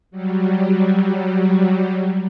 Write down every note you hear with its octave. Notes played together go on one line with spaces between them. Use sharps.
F#3 G3